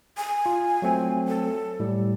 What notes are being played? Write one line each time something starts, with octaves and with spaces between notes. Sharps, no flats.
G#5
F4
F#3 A3 C4
A4
A2 G3